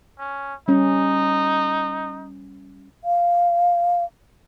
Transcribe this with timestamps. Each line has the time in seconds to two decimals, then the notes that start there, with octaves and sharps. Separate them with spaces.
0.19 C#4
0.68 G3 C#4 D#4
3.04 F5